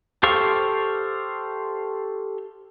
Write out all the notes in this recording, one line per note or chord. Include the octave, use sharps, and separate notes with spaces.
G4 A4 C5 F5 C#6